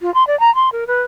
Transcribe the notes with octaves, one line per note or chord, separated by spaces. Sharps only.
F4
C6
D5
A#5
C6
A#4
B4